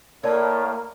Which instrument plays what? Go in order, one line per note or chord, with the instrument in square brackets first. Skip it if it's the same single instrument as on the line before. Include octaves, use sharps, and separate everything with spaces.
[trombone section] A2 [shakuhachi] A#3 [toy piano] A#4 D5 A5 [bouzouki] C#5